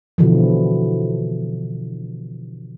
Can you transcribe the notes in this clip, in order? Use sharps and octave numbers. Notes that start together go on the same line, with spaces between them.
B2 D3 E3 F3